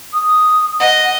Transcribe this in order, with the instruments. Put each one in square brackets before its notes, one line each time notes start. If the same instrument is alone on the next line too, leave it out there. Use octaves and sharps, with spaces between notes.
[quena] D#6
[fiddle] D#5 [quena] F#5